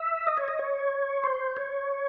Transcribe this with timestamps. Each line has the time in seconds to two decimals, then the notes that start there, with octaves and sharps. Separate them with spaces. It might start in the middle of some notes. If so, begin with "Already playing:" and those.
Already playing: E5
0.27 D#5
0.37 C#5
0.48 D#5
0.59 C#5
1.24 C5
1.57 C#5